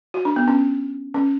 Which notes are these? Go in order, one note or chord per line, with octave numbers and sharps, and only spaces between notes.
F#4
D4
B3
C#4
C#4